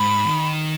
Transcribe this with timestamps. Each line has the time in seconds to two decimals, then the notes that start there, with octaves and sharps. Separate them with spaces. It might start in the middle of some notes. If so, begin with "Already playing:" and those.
Already playing: G#2 B5
0.25 D#3